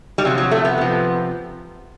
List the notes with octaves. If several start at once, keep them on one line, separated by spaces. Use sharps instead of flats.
G3
C3 F3 F#3
F#3
A3
B3
C3 F3